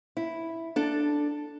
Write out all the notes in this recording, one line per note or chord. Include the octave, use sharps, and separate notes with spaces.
E4
D4 A4